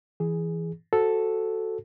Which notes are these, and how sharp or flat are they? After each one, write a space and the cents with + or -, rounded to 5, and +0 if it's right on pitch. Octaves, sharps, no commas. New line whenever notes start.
E3 +0 G#4 +0
F#4 +0 A4 -5 C5 +0